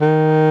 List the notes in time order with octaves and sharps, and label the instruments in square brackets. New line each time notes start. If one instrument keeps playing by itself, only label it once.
[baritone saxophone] D#3